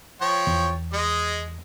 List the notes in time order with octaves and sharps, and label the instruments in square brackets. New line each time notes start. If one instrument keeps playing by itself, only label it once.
[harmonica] F3 C#5 G5
[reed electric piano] E2
[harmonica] G#3 D#5